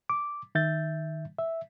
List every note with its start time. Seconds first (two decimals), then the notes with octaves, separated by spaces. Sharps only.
0.10 D6
0.55 D#3 E5 G6 A6
1.39 E5